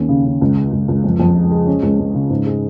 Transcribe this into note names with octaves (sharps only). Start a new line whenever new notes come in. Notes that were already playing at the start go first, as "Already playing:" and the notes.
Already playing: D#2 C#4
C#3
C#3
C#2
G#3
C#2
C#2
F2
F2
G#3
G#3
C#4
C#2
C#2
C#3
G#2
G#3